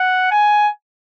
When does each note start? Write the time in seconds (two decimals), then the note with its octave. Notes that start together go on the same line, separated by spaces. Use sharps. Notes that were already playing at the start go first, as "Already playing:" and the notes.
Already playing: F#5
0.31 G#5